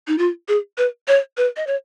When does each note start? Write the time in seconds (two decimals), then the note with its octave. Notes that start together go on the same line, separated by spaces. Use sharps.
0.07 D#4
0.18 F4
0.48 G#4
0.78 B4
1.08 C#5
1.37 B4
1.56 D#5
1.67 C#5